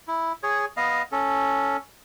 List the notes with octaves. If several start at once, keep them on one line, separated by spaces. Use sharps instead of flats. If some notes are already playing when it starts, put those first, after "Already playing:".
E4
G#4 C#5
B3 D#5 F5
C#4 A4